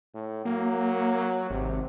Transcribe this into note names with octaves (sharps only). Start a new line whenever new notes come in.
A2
F#3 A#3
G#1 C3